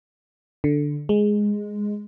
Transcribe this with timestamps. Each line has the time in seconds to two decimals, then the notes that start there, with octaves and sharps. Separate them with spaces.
0.64 D3
1.09 G#3